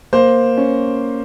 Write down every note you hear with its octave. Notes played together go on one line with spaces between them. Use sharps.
A#3 C5
C#4